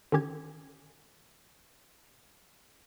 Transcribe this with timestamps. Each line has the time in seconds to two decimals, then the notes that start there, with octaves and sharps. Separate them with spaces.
0.12 D3 D#3 C#4 G4 G#6